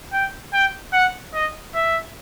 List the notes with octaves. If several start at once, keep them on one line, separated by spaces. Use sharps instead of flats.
G5
G5
F#5
D#5
E5